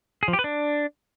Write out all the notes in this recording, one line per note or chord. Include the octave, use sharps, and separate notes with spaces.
G#4
F3
G4
B4
D4